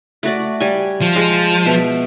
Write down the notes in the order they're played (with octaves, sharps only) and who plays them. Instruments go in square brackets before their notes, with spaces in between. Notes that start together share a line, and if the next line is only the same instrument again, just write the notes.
[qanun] A3 F#4 D5
G3 G#5
[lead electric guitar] F3
[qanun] G#3
B2 E5